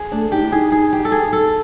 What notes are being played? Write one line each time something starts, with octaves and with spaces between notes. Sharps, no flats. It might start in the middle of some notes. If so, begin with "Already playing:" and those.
Already playing: G#4
A3 D4
D#4 G4
E4
D#4 G#4
G#4
G4
A4
G#4
A4